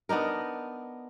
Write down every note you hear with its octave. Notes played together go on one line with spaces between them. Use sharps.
B3 D4 D#4 A#4